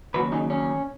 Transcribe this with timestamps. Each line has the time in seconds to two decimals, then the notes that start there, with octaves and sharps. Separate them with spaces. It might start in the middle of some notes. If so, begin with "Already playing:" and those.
0.14 D#2 C#3 F#3 C#4 F#4 B4
0.32 D#4 G#4
0.50 C#4